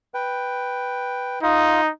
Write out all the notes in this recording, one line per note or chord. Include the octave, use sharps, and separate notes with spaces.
B4 G5
D#4 F4 F5 D#6